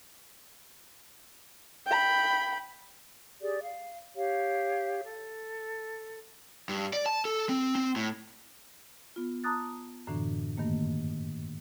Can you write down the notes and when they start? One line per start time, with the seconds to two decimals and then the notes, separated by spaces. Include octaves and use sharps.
1.87 G5 B5
3.41 G4 G#4 D5
3.64 F5
4.16 G4 C#5 F5
5.04 A4
6.69 G2
6.93 D5
7.06 A5
7.25 A4
7.49 C4
7.75 C4
7.96 A2
9.16 B3 F4
9.44 A5 A#5 D6 D#6 F#6 A6
10.07 F#2 A2 D3 E3 D4
10.58 G2 D#3 A3 A#3